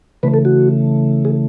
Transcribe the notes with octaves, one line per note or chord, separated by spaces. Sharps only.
C#3 E3 A3 B4
A4
F#4
G#4